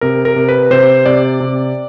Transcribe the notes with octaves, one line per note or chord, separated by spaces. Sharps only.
C3 A#4
A#4
C3
B4
C3 C5
C3 D5
C3